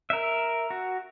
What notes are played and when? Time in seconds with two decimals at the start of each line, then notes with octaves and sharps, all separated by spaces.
0.10 A#4 E5
0.70 F#4